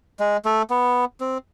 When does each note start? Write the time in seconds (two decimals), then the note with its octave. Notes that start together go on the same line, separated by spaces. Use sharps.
0.20 G#3
0.45 A3
0.70 B3
1.20 C4